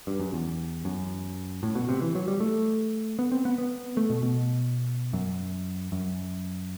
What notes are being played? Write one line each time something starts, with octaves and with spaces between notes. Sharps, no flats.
G2
F#2
E2
F#2
A2
B2
C3
E3
F#3
G3
A3
B3
C4
B3
B3
A3
B2
B2
F#2
F#2